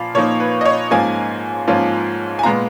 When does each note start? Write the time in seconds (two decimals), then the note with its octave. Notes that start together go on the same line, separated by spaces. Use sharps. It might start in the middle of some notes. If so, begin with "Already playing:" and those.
Already playing: A#2 F3 F5 B5
0.15 A#2 F3 A#3 D#4 C#5
0.40 B4
0.61 D#5
0.65 C#5
0.91 G#2 F3 A#3 C#4 F4 G#5
1.67 G#2 F3 A#3 C#4 F4
2.39 G#5
2.43 A#2 G#3 B3 F4 A#5